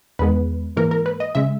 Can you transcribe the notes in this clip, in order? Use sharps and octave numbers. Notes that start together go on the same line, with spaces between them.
E2 D#3 G#3 B3 B4
G#2 E3 A#3 A#4
A#4
B4
D#5
C#3 G#3 E5